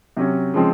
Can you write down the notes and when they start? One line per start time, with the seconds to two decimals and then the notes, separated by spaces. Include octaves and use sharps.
0.17 C3 F#3 C#4
0.54 C#3 F3 G#3 C4